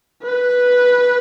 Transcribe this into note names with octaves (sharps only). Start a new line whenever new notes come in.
B4